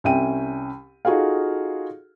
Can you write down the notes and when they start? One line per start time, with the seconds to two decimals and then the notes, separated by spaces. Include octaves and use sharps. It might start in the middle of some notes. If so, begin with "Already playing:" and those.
0.04 C2 C#4 E5 G5 D#7
1.05 D#4 F4 F#4 G#4 A4 F5